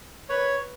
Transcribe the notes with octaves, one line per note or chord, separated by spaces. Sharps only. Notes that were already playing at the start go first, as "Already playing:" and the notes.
B4 C#5